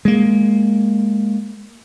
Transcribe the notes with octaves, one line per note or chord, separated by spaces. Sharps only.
G#3 A#3